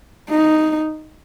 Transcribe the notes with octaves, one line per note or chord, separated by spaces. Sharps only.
D#4